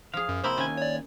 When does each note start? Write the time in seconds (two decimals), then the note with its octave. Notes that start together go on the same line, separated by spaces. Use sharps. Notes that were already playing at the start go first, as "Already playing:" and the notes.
0.14 F3 G#4 F5
0.29 F#2
0.44 C3 A#3 E4 C5 B5 C6
0.58 D#2 C#4 G#5
0.77 C#5 D5